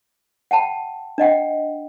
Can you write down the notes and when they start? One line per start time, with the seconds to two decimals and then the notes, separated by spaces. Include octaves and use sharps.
0.51 F#5 G5 A5 B5
1.18 D4 D#5 F#5 G5